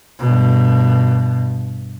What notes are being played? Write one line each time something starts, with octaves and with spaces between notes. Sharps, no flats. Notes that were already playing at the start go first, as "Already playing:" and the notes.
G2 B2